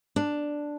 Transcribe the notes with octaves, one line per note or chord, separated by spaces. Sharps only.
D4